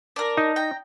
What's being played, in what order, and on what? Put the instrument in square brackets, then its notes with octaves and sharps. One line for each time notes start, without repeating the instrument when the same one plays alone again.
[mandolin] D4 A#4
[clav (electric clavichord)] D#4
[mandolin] G5 A#5